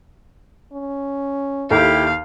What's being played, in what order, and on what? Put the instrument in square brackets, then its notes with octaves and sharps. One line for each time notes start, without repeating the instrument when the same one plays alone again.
[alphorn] C#4
[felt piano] D#2 A4 [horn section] E4 G4 [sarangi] F5